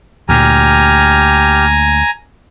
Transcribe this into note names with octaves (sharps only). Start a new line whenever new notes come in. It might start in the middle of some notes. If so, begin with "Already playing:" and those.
D2 A#2 G4 G#5 A#5 F6